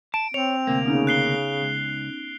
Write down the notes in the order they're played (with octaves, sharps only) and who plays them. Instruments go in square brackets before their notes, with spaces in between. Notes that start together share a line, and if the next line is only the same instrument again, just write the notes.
[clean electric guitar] A5 [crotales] D7
[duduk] C4 [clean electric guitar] C#5 [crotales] F7
[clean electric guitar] D2 C3 A#3
[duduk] C#3 [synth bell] B3 C#4 D#4
[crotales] F#6 C7 G7
[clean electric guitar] C#2